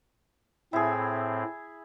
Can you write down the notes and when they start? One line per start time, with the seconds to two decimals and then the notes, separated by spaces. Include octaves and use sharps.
0.73 A2 C4 E4 G#4